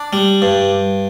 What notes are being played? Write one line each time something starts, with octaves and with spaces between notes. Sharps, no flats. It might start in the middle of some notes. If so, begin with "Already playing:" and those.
Already playing: D4
G3
G2